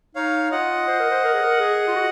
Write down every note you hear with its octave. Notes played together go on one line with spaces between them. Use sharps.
D#4 C#5 F5
F4 D#5 F#5
C5
A#4
C5
A#4
G#4
A#4
G#4
F4
F#4